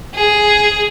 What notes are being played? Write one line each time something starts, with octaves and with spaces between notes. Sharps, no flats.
G#4